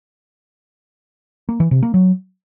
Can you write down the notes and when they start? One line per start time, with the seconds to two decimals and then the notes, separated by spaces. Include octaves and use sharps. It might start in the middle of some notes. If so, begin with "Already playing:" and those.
1.49 A#3
1.60 E3
1.71 C3
1.83 A#3
1.94 F#3